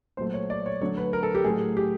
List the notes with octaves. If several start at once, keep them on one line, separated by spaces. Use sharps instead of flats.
A#2 F#3 A3 C5
C#5
D5
C#5
D3 F#3 A3 C#5
B4
A#4
A4
G4
A2 F#3 A3 G#4
G4